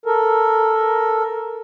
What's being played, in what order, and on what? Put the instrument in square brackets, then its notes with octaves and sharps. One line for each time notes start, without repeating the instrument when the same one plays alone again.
[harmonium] A4 A#4